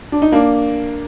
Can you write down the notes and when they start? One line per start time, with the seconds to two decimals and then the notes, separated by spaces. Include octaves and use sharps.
0.12 D4
0.22 D#4
0.32 A#3 D4